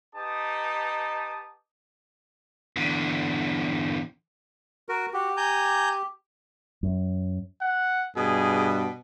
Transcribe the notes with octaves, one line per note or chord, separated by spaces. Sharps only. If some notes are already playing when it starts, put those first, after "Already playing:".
D#4 G4 B4 A5 D#6
E2 D3
F#4 A#4
F#4 G4
G#5 A#5 G6
F#2
F#5
G2 B2 G#4